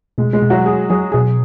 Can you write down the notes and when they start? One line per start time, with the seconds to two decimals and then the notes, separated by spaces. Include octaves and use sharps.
0.18 B2 G#3
0.33 G#3
0.42 B2
0.50 F#3 F#4
0.66 F#4 G#4
0.90 F#3 G#4
1.12 B2 G#4